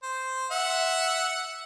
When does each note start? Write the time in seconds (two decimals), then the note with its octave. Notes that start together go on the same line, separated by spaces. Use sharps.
0.03 C5
0.51 E5 F#5